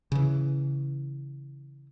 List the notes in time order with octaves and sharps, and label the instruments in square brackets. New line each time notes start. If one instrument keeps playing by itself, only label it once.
[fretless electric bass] C#3 E3